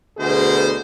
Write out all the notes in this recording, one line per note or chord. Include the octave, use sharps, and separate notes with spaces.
D2 B2 G#4 C5